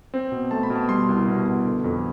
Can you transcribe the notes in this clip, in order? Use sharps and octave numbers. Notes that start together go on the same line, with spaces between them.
C4
B2
A3 A5
B5
B2
A5
G3 C6
C2
B2
B2
D3
F2